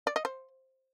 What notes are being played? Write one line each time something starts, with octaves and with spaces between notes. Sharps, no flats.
D5
D#5
C5